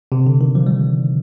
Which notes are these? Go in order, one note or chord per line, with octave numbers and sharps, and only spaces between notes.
C3
D3
D#3
F3
G3